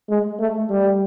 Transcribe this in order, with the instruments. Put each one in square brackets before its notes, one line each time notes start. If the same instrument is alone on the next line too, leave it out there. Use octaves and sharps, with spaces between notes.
[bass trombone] G#3
A3
G3